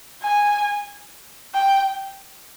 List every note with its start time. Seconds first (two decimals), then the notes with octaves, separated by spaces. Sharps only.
0.23 G#5
1.54 G5